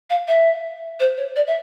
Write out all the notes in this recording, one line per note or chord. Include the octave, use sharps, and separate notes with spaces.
F5
E5
C5
C#5
D5
E5